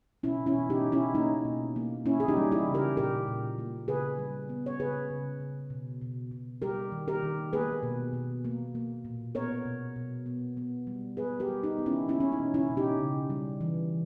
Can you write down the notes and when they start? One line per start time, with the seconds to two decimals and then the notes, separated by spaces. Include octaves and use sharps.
0.23 B2 C#4 E4
0.46 C#4 E4
0.55 B2
0.70 D#4 G4
0.84 B2
0.92 C#4 E4
1.15 A#3 D#4
1.45 B2
1.76 A#3
2.06 A#3 C#4 E4
2.20 G#4
2.28 D#4 G4
2.37 G3
2.52 E4 G#4
2.67 C#3
2.74 G4 A#4
2.97 A#2 G4 A#4
3.28 A#2
3.59 A#3
3.88 C#3 G#4 B4
4.18 G3
4.49 B3
4.66 C#5
4.79 C#3 G#4 B4
5.10 C#3
5.40 C#3
5.70 B2
6.01 B2
6.31 B2
6.62 G3 G4 A#4
6.92 D#3
7.08 G4 A#4
7.23 D#3
7.53 A#3 G#4 B4
7.83 B2
8.13 B2
8.45 A#3
8.75 A#3
9.05 A#2
9.35 B3 A#4 C#5
9.66 B2
9.96 B2
10.26 B3
10.57 B3
10.87 G3
11.17 B3 G#4 B4
11.40 G4 A#4
11.48 G3
11.63 D#4 G4
11.78 B3
11.86 C#4 E4
12.09 A#3 C#4 E4
12.20 C#4
12.32 D#4
12.39 B2
12.54 C#4 E4
12.69 B2
12.77 D#4 G4
13.00 C#3
13.30 G3
13.61 E3